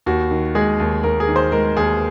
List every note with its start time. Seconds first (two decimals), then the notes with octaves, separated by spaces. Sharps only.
0.06 D#2 F#4
0.31 D#3
0.55 G#3 G#4
0.80 D#2
1.04 D#2 A#4
1.20 G#4
1.28 D#3
1.36 C5
1.52 G#3 A#4
1.76 D#2 G#4